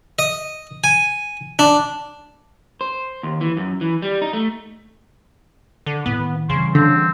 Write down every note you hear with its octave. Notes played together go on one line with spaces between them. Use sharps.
D#5
G#5
D4
C5
D#2
E3
F#2
E3
G3
D#4
A3
D3
A2 D#3 B3
C#3 E3 G3 C6
D3 C4